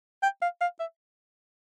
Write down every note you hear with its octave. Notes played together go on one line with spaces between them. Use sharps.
G5
F5
F5
E5